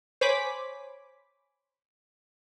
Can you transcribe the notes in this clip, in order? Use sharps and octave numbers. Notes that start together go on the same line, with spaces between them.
C5 C#5 G#5 B5 D6 B6